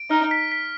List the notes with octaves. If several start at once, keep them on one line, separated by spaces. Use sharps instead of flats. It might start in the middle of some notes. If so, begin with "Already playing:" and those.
Already playing: D7
D#4 F6
B6
B6